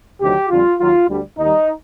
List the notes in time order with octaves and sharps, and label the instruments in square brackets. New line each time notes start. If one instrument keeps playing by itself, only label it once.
[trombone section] D2 C3 D#3 F#3 G4
F2 D3 G3 F4
D#2 D#3 F#3 F4
D2 D3 G3
D#2 D#3 G3 D#4